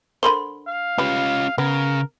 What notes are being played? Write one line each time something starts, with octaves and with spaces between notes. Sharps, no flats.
D3 A#4 C5 B5 C6 G7
F5
G3 C#4 F4 B4
C#3 B3 A#4